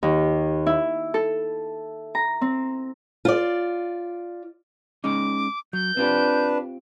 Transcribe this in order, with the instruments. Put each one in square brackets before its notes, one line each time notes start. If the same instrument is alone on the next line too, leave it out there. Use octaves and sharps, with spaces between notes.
[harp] D#2
E4
A4
A#5
C4
[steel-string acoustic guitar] F4 D5
[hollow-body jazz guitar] G#3 C#4 D#4 [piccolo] D6
[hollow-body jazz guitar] F#3 [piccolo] G6
[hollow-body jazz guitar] C4 F4 G4 [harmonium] D4 B4